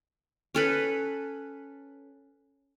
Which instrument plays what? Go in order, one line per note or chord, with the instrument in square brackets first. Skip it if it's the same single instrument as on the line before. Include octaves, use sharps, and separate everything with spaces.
[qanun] C#4 A4 B4